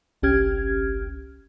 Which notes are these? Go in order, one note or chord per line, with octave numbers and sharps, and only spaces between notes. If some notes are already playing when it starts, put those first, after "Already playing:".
G1 C2 C#4 G4 F6 G#6